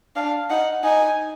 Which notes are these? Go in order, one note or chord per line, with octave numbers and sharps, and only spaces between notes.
D4 F5
D#4 F#5
D#4 G#5